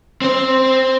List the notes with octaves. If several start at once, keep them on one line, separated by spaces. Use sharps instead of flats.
C4 C5